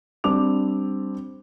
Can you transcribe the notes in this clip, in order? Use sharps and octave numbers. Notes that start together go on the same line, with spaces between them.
G3 C4 D4 D6 F7